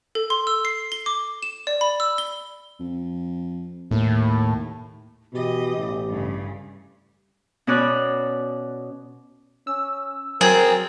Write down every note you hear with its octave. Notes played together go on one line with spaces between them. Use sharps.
A4
C6
E6
C7
G7
D6
E7
D5
B5
E6
G7
F2
D#2 A2
B2 E3 G4 D#5
A1
G2 C#3
B2 C#4 C#5 D5 F#6
C#4 E6
F#3 C4 G#4 A#4 A6